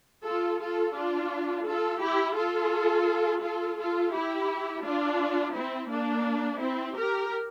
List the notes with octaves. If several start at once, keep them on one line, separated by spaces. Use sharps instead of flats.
F4 A4
F4 A4
D4 F4
F4 A4
E4 G4
F4 A4
F4 A4
F4 A4
E4 G4
D4 F4
C4 E4
A#3 D4
C4 E4
G4 A#4